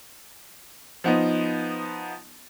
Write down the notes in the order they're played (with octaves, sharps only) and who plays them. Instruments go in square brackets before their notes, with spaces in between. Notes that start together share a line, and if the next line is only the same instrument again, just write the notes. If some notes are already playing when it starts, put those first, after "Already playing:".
[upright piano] F3 B3 D#4